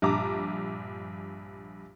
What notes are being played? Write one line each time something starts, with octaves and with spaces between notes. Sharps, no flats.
A#1 G2 A5 A#5 D6